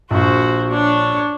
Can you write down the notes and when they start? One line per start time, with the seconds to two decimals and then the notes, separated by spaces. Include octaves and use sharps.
0.11 A#1 F#4 C5
0.71 D4 C#5